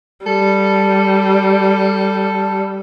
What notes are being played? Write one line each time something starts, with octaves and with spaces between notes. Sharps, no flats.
G3 A4